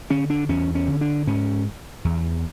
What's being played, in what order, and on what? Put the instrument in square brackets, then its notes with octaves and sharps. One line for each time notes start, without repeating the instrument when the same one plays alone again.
[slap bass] D3 C#4
D4
E2 C#4
C#4
D3
D4
G#2 C#4
E2